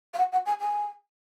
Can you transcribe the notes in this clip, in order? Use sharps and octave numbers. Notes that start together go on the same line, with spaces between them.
F5
F#5
F#5
G#5
G#5